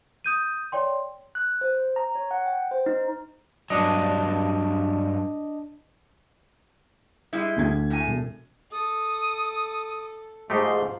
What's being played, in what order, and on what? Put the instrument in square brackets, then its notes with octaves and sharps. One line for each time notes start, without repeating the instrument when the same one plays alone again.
[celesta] D#6 G6 D#7
C#5 D5 G5 C6
[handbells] F#6
C5
A#5
C#5
F#5
G5
C5
D#4
[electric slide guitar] G2 F#3 [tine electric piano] D4 D#5
[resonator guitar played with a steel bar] G3 G#3 E4
[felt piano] D2 D4 G#6
[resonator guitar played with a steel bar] A2 G#5
[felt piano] E1
[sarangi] A4 [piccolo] D#6
[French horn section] G#2 [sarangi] F3 [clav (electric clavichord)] A3 D#4 G4 [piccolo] C6